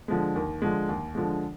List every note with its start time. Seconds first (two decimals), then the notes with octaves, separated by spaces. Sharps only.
0.08 D3 F3 G#3
0.36 D#2
0.62 D3 F3 G#3
0.89 D#2
1.15 D3 F3 G#3